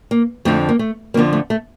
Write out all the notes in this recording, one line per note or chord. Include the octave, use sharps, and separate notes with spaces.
A#3
F2 D3 F3 A3
A#3
A3
F2 D3 F3 A#3
A3
A3